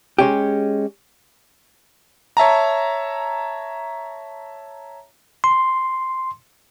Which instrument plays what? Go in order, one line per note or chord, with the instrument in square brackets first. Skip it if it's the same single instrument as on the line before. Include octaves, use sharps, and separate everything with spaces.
[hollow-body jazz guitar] G#3 C#4 G4
[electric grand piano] C#5 E5 A5 A#5
[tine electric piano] C6